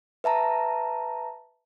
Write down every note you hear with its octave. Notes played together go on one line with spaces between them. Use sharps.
B4 E5 A5 A#5